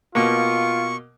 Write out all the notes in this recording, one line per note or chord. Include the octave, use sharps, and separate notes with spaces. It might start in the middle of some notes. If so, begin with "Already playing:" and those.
B2 A#3 F4 C#6